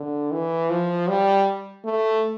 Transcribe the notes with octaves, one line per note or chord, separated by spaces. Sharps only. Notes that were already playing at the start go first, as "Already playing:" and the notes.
Already playing: D3
E3
F3
G3
A3